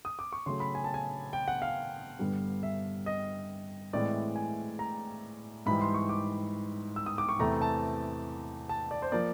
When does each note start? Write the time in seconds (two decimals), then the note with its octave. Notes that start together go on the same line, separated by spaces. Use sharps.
0.05 D#6
0.19 D6
0.33 C#6
0.46 C#3 F#3 A3 C6
0.60 B5
0.75 G#5
0.84 A5
0.94 G#5
1.33 G5
1.48 F#5
1.62 F5
2.19 G2 D3 G3 B3
2.63 E5
3.06 D#5
3.93 A2 E3 G#3 C4 D5
4.36 G#5
4.79 A#5
5.66 G#2 E3 G3 B5
5.81 C6
5.94 C#6
6.09 D6
6.96 E6
7.06 D#6
7.18 D6
7.29 C#6
7.39 E2 C3 E3 A3 C4 A#5
7.62 A5
8.69 A5
8.91 D5
9.02 C5
9.12 F3 A#3 D5